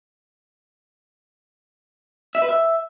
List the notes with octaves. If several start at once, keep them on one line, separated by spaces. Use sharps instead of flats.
E5
B4
E5